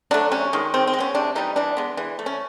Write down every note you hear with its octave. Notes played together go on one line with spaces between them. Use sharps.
F#3 A3 D4
C3 C#4
D#3 G#3
D#3 C4
C4
G#3
B3 C#4
C3 D4
E3 G3 D#4
E3 D4
G#3 B3
E3
A3
C#4